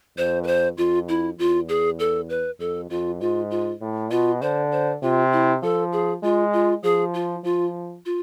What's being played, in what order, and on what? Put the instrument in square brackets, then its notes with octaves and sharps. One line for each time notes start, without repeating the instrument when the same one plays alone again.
[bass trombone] F2 [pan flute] C5
[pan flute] B4
C5
[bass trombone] F2 [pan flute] F4
[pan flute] E4
[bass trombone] E2 [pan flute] F4
[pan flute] G#4
A4
B4
[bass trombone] F2 [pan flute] A4
[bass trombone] F2 [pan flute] F4
[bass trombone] G#2 [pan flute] F4
[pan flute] F4
[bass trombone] A2
[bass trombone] B2 [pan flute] F4
[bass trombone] D3 [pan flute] C5
[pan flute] C5
[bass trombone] C3 [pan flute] F4
[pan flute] E4
[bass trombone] F3 [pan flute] A4
[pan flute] G#4
[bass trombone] G#3 [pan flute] F4
[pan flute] F4
[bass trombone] F3 [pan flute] G#4
[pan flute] F4
[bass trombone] F3 [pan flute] F4
[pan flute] F4